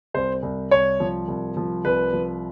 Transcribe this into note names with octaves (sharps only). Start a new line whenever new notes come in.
C2 C5
C2
C2 C#5
F3
C2
F3
C2 B4
F3